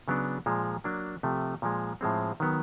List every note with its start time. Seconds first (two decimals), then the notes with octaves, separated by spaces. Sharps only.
0.08 C#3 F#3 B3 D4
0.46 A#2 F3 G#3
0.84 F#3 A#3 D4
1.23 C3 F3 A3
1.62 A#2 F3 G#3
2.01 A2 F3 G#3 C4
2.40 D#3 F#3 B3